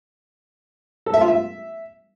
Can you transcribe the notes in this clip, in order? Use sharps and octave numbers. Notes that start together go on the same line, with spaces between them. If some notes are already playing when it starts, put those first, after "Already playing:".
A4
E5
F4
E5